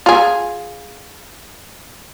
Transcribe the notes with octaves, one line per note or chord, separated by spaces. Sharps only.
F4 G#4